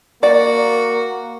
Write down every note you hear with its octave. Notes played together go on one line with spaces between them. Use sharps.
A#3 F#4 D5